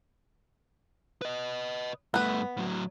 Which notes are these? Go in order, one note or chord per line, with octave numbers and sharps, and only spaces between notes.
B4 D#5
G2 A3 B3 B4
A2 F#3